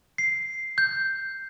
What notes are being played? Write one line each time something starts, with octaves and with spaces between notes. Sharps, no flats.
C7
G6